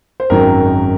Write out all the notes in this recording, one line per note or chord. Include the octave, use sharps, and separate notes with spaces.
C5
G#1 F#2 D#3 F#3 A#4